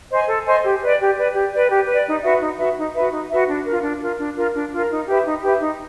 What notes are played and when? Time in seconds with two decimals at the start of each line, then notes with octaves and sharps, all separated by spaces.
0.11 C5 D#5 G#5
0.28 A4
0.46 C5 D#5 G#5
0.64 G4
0.81 B4 D5
1.00 G4
1.17 B4 D5
1.34 G4
1.53 B4 D5
1.70 G4
1.88 B4 D5
2.06 D#4
2.23 F#4 B4 E5
2.41 D#4
2.59 F#4 B4 E5
2.77 D#4
2.95 F#4 B4 E5
3.12 D#4
3.30 F#4 B4 E5
3.48 D4
3.65 F4 A#4
3.83 D4
4.01 F4 A#4
4.19 D4
4.37 F4 A#4
4.55 D4
4.72 F4 A#4
4.91 D#4
5.07 G4 B4 E5
5.25 D#4
5.43 G4 B4 E5
5.61 D#4